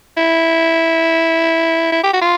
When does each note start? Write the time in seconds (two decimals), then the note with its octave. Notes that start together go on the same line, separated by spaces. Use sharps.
0.17 E4
1.92 E4
2.04 G4
2.13 F#4
2.21 F4